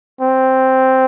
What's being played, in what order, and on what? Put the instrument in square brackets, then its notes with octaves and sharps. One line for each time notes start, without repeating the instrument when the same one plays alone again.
[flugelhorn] C4